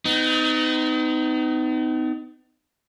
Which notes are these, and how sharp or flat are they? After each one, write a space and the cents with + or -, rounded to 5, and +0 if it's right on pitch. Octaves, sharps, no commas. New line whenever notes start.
B3 +45 D#4 +0